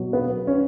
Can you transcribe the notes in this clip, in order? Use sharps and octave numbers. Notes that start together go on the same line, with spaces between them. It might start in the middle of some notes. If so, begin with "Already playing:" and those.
Already playing: B2 F#3
B3
C#4